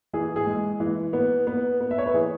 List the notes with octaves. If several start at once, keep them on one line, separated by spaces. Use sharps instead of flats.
E3 G#4
G#4
G#3
E3
B3
B3
B3
E5
C#5
B4
E3 G#4